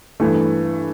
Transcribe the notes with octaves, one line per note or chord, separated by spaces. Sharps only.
G2 E3 A3